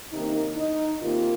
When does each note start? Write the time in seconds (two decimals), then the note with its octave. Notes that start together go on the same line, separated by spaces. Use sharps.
0.12 C3 D#3 A#3 C#4 D#4
0.56 D#4
1.01 C3 D#3 A#3 F4